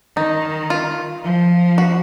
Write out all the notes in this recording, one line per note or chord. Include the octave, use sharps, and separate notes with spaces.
D#3 D#4
F4
F3
F#4